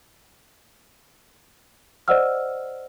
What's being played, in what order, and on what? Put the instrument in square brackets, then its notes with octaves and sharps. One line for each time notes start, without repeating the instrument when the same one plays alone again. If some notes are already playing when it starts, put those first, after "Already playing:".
[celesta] C5 D5 D#5 F#5 E6 F6